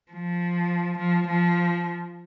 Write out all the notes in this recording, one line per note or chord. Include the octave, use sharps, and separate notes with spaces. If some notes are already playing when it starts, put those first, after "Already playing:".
F3
F3
F3